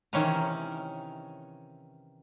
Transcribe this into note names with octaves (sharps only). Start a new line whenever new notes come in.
C3 D#3 E3 C#4 E5 A#5